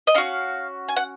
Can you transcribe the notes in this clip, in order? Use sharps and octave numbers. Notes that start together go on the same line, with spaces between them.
D#5
C#4 F#4 F5
G#5
F#5